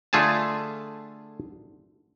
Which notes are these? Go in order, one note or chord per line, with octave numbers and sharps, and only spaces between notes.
D3 A3 F4 G#4 G#5 A5